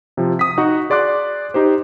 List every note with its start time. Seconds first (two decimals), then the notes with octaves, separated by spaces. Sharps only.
0.17 C3 F3
0.39 D#6 B6
0.58 D#4 F#4 F#5 C#6
0.90 G#4 D5 C6 D6 F#6
1.54 D#4 G4 C5